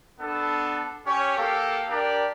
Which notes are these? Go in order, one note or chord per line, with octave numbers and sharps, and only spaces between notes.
B3 D4 A4
C#4 G4 C#5
A#3 G4 A4 F5
D4 G4 A#4 D5